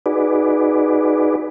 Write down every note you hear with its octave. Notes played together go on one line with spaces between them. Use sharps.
D#4 F#4 G#4 B4 D5